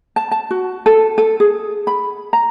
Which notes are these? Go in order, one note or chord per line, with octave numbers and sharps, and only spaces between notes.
A5
A5
F#4
A4
A4
G#4
B5
A#5